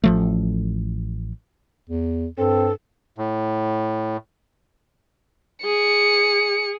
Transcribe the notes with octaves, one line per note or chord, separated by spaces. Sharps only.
A1 F3 A3
E2
G2 C4 A4
A2
G#4 C#7